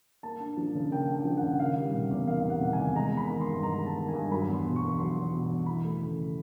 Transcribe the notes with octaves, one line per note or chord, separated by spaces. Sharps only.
A#3 A5
D4
F3
C#3
A#3 G5
D4
G5
F3
F#5
C#3
D#3 F5
G3
C3
E2
D#3 F5
G3
F#5
C3
G#5
E2
G#3 A#5
B3 B5
D#3
C6
G2
G#3 A#5
B3
A5
D#3
G#5
G2
F#3 B5
E2
C6
B2
C#6
E2
F#3 C6
E2
B2
E2
E3 B5
A3
C#3